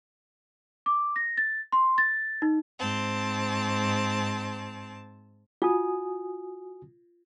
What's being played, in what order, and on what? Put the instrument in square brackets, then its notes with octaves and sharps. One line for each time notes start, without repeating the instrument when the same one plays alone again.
[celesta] D6
A#6
A6
C6
A6
D#4
[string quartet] G#2 C4 A5
[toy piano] F4 [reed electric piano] F#4 G#5 D#6